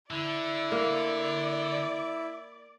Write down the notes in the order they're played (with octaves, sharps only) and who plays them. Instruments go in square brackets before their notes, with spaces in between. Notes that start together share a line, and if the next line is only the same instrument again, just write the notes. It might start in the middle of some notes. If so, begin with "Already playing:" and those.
[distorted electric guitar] D3 [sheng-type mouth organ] E4 E5 [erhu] D5
[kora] A#3